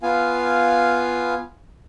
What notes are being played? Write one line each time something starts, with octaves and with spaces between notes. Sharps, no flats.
B3 F4 F5 G#5